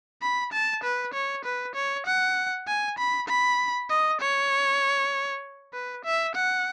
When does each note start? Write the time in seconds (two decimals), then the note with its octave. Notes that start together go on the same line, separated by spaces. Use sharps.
0.22 B5
0.53 A5
0.84 B4
1.14 C#5
1.45 B4
1.75 C#5
2.06 F#5
2.67 G#5
2.99 B5
3.28 B5
3.90 D#5
4.21 C#5
5.73 B4
6.05 E5
6.35 F#5